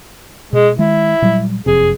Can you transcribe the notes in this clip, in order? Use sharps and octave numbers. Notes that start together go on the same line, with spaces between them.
B2 G#3
D#3 G#3 E4
A#2 F#3 G3
F#1 F2 C3 G#4